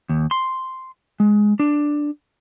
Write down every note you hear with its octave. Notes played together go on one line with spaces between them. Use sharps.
D#2
C6
G#3
D4